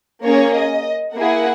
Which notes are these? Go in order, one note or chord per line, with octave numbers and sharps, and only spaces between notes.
A#3 C#4 G#4 C#5
D#5
A#3 E4 G#4 F#5